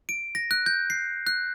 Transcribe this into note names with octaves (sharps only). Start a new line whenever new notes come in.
D7
A#6
F#6
G6
C7
F#6